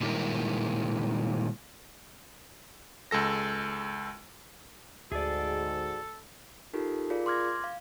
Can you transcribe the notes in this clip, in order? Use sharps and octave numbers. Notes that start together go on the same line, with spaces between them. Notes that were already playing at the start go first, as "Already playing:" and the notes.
A#2 D#3 G3 G#3 E4 A#4
C#2 G#3 A4 A#6
D2 G#2 F#4 G#4 A4 D5
D#4 F4 G4 A4 A#4
F4 G#4 A#4 D5 F5
C6 D6 F6 G#6 A#6
F5